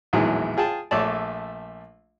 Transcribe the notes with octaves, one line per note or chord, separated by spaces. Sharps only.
A#1 E2 A2 D#3 F#3 G#3
F4 G#4 G5 A5
A#1 A3 C#5 D5 A5